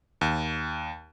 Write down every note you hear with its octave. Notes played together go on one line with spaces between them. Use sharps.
D#2